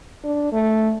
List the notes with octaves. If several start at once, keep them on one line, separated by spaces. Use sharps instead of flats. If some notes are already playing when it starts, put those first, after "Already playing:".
D4
A3